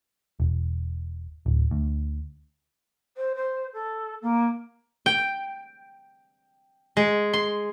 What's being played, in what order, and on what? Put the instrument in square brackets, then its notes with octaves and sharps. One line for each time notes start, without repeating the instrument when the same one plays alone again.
[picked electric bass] E1
D1
D2
[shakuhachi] C5
C5
A4
A#3
[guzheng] G5
G#3
C6